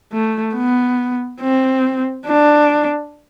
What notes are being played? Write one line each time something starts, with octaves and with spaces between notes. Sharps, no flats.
A3
B3
C4
D4